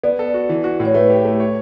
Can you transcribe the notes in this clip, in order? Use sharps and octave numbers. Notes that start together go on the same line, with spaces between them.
B3 D5
A4
F#4
E3
F#4
A2
C#5
A3 B4
G4
A3
C#5